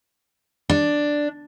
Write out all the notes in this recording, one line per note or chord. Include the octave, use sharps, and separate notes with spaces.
D4